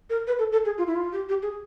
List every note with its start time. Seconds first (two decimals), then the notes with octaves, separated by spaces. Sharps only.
0.10 A#4
0.27 B4
0.39 A4
0.52 A4
0.65 G#4
0.78 F4
0.87 E4
0.96 F4
1.12 G4
1.29 G4
1.43 G#4